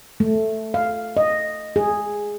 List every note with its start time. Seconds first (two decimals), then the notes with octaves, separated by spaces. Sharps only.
0.20 A3
0.74 F5
1.17 D#5
1.76 G#4